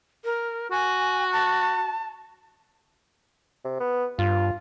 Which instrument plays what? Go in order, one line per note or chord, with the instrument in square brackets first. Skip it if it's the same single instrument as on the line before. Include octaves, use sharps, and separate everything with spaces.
[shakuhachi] A#4
[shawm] F#4 [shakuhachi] G#5
[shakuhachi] A5
[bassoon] C3
B3
[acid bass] G2 [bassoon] F4